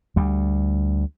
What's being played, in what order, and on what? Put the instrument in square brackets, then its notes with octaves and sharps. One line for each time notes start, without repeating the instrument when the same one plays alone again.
[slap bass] D2 G3